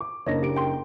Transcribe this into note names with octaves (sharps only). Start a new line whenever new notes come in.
D6
F#1 A#3 D4 C#5 D#5 A#6
G4 D7
G5 C6